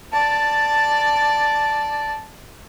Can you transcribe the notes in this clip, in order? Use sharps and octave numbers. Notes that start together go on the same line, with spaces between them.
D5 A5